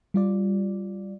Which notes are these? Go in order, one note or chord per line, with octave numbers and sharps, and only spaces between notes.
G3 F4 D5